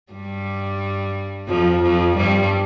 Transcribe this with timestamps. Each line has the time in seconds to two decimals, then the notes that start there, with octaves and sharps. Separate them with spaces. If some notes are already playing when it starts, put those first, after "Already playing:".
0.13 G2 G3
1.48 F2 F3
1.83 F2 F3
2.16 G2 G3